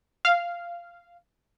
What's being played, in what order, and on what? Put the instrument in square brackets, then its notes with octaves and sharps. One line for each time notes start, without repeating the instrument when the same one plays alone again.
[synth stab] F5